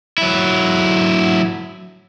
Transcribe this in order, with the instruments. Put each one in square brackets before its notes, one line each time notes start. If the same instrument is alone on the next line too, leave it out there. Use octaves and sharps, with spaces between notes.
[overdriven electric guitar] F#3 E4